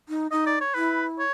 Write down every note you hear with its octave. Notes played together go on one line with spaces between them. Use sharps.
D#4
D#4 D#5
D5
C#5
E4 B4
C#5